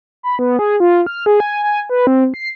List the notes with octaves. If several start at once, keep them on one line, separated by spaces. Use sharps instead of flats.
B5
B3
G#4
F4
F6
G#4
G#5
G#5
B4
C4
C7